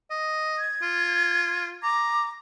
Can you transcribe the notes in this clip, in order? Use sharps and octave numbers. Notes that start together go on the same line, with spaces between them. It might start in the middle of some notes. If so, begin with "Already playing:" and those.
D#5
G#6
F4
A#5 D6